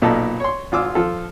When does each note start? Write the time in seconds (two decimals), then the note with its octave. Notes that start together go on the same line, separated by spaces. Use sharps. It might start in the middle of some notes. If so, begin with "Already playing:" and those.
0.02 B1 A#2 B3 D#4 A4 A5
0.40 C#5 C6
0.72 G#1 F4 D6 E6
0.95 F3 F4 A4